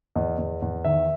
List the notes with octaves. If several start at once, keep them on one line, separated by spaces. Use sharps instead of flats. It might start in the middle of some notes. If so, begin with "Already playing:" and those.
E2 D#5
E2
E2
D#3 E5